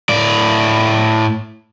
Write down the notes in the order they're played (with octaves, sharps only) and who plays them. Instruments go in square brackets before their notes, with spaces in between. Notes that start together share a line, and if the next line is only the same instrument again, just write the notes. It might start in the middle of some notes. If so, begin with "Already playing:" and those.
[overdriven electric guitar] A2 D5